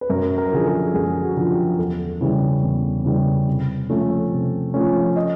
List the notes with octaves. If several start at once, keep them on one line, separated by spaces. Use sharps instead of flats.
B4
F#2 A#4
A#4
D3 F3 G#4
A4
F#2 G#4
F#4
D3 F3
G4
E2 A4
C#3 E3 G3
E2
C#3 E3 G3
C3
F3 A3 C#4
C3
F3 A3 C#4
D#5